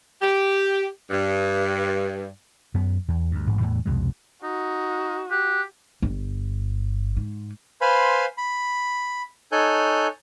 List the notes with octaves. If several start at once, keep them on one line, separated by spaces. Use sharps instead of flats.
G4
G2
F#2 B3
E2
D2 G2
A1 G#2
E2 A2 E3
C2 F2 B2 G#3
D#4 F#4
G4 F#6
G1
G#2
B4 C5 F5 G#5 B5 C6
B5
D#4 A4 C#5 G#5 F#6 G6